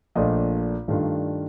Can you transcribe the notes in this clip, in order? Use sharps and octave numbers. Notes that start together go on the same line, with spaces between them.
A#1 A#2 A3 D4 D#5
G2 D#3 A3 D4 F4